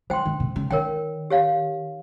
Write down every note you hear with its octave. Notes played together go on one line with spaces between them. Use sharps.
F3 C5 G5 C6
D#3
C3
C#3
D#3 A#4 C#5 G5
G4 C#5 F5